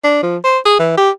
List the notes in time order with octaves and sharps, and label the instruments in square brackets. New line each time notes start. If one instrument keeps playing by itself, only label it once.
[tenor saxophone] D4
F3
C5
G#4
E3
G4